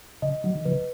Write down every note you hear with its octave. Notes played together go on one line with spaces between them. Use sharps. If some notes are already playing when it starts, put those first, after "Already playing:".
C#3 D#5
D#3 F#3
D#3
C#3 F3 B4